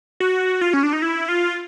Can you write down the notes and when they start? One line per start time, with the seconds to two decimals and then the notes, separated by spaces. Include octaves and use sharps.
0.20 F#4
0.61 F4
0.73 C#4
0.83 D4
0.93 D#4
1.02 E4
1.29 F4